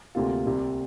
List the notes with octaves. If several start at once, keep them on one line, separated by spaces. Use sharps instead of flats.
D2 C3 A#3 F4
C2 C3 G3